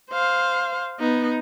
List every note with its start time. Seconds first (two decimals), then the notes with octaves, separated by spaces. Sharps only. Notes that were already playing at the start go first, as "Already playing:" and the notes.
0.10 C5 F5
0.99 B3 D#4